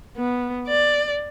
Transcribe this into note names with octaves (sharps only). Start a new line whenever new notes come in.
B3
D5